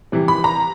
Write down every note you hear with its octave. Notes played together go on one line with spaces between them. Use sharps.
C3 E3 G3
B5
A#5